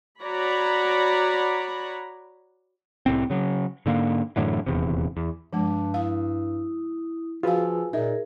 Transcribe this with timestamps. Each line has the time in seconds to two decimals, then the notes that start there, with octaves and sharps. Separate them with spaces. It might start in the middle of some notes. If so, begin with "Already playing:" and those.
0.22 F#4 C#5 D5 A#5 B5
3.06 C2 A2 C4
3.30 C#3 F#3
3.86 G#2 D3 A#3
4.36 F#2 A2 D3 E3
4.66 D#1 E2 C3
5.17 E2
5.53 G2 F3 G#3 D4 A5
5.94 E4 F5 D#6
7.43 F3 F4 F#4 G#4 B4 F5 G#5 E6
7.93 A#2 D#4 G#4 A#4 E5